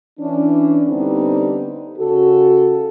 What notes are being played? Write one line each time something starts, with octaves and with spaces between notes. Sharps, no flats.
E3 C#4 D4
D3 G3 B3 C4 D4 D#4
C#3 F#4 A4